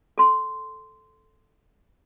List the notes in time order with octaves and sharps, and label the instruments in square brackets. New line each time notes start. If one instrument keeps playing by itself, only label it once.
[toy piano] A4 C6